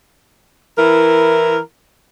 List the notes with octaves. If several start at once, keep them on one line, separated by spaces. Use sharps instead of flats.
E3 E4 A#4